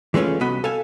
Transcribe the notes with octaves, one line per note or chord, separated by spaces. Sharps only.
E3 G#3 A3 C#4 F4
C2 B3 F#4 D#5 B5
A4 F5 G#5